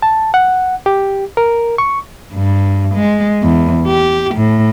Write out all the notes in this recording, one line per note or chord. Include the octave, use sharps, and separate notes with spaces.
A5
F#5
G4
A#4
C#6
G2
G#3
E2
G4
A2